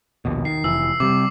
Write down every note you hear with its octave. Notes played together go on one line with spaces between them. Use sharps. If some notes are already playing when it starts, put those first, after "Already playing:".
A#1 D#2 B2
D#3 C7
F1 E3 E6
C3 G3 D6